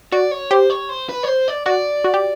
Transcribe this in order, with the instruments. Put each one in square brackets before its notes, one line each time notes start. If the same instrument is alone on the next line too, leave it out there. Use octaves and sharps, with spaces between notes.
[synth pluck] F#4 [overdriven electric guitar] D5
[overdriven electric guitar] C#5
[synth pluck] G4 [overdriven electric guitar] C5
[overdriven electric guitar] C#5
C5
B4
C#5
C5
D5
[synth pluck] F#4 [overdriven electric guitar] D5
[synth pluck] F#4
G4